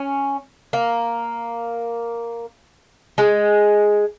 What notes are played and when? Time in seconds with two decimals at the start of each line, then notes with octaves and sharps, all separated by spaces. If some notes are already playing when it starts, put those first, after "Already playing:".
Already playing: C#4
0.73 A#3
3.18 G#3